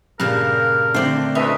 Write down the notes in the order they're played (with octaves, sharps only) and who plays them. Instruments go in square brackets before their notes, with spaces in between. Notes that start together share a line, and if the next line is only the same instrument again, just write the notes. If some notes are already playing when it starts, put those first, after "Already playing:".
[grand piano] G2 [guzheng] A#2 C#3 [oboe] A#4
[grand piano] D3 A3 C4 [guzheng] C5 D5
[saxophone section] D2 E5 [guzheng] C#4 [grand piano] B4 [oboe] D#5